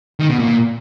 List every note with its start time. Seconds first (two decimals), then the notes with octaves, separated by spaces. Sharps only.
0.20 D#3
0.29 B2
0.39 A#2